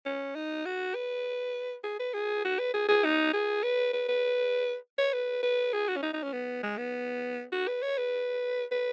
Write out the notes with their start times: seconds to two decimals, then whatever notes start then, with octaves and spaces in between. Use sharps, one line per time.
0.06 C#4
0.36 D#4
0.65 F#4
0.95 B4
1.84 G#4
1.99 B4
2.14 G#4
2.45 F#4
2.59 B4
2.74 G#4
2.89 G#4
3.05 D#4
3.34 G#4
3.64 B4
3.93 B4
4.09 B4
4.98 C#5
5.13 B4
5.43 B4
5.73 G#4
5.89 F#4
5.96 C#4
6.03 D#4
6.13 D#4
6.23 C#4
6.33 B3
6.63 G#3
6.78 B3
7.52 F#4
7.68 B4
7.83 C#5
7.98 B4
8.72 B4